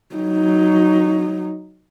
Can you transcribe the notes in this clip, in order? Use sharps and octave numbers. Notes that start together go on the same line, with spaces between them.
F#3 D#4